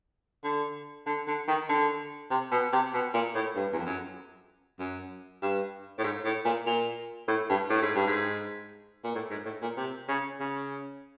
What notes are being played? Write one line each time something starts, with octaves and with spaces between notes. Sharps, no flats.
D3
D3
D3
D#3
D3
C3
B2
C3
B2
A#2
A2
G2
E2
F2
F#2
F#2
G2
A2
G#2
A2
A#2
A#2
A2
G2
A2
G#2
G2
G#2
A#2
A2
G#2
A2
A#2
C3
C#3
C#3